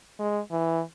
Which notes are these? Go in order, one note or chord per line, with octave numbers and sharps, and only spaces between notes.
G#3
E3